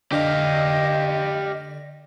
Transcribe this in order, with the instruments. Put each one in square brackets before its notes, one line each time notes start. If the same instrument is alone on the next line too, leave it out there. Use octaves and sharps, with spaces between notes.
[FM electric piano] D3 D5 A#6 [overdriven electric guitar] G4 F5 [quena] D#5